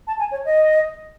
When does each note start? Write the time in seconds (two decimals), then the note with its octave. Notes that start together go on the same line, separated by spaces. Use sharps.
0.07 A5
0.19 G#5
0.31 C#5
0.45 D#5